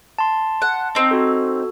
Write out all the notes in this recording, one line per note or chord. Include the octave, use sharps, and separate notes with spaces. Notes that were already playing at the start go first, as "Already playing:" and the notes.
A5 C6
F#5
C4 D#4
F#4 A4